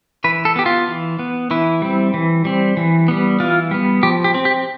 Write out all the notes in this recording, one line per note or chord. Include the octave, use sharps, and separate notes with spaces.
E3 B4
A4
B3 G4
F4
E3
B3
E3 E4
G3 C4
E3
G3 C4
E3
G3 B3
E3 F4
G3 B3
F3 G4
G4
C4
G4